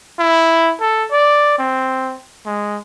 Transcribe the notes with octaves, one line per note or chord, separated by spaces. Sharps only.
E4
A4
D5
C4
G#3